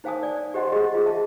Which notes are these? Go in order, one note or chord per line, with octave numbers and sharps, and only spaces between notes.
D#4 C5 F5 G#5 A5 D#6
D5 G#5
G4 C5 D#5 F#5 C6
G4 G#4 D#5
F4 G#4
E5 A5